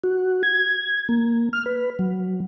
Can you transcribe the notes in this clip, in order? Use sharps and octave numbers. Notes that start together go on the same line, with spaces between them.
F#4
G#6
A#3
F6
B4
F#3